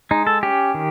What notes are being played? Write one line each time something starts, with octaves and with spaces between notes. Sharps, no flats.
G#3 D#4
A4
C#4 G4
D#3